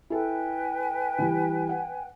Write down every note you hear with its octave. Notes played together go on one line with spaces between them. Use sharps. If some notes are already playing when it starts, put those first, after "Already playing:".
E4 A4 B4 G5 G#5
E3 G3
F#5